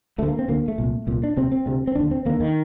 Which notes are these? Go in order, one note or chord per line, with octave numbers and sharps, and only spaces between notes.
D2 D3 A3
A#3
C4
D2 D3 A#3
A3
C2 A#2
C2 A#2
D4
D2 C3 C4
C4
D2 C3
C4
D#2 D3 D4
C4
D#2 D3 A#3
D#3